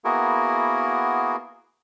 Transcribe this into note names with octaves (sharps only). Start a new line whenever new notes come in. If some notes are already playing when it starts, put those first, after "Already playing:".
A#3 B3 E4 F#4 G#4 A#4